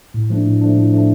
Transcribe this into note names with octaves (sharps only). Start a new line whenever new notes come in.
A2
F3 A3 D4
A2
F3 A3 D4
A2
F3 A3 D4